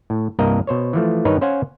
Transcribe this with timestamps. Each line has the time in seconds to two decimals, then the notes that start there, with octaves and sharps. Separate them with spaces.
0.10 A2
0.39 C2 G2 A#3 A#4 D#5
0.67 B2 C5 C#5
0.93 E3 F3 A3
1.25 G2 D#3 D#4 A#4 B4 C#5
1.41 C#4 C5 F5 F#5 G#5